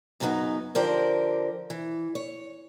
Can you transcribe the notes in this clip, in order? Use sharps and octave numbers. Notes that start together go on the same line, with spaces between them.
F#2 C#3 F#3 G3 B3 D#4
D3 F3 G4 A#4 C5 D5
E3
C#5